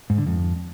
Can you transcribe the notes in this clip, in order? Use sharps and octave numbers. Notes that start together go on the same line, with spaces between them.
G#2
D3
F2